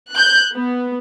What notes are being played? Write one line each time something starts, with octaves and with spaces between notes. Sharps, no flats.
F#6 G6
B3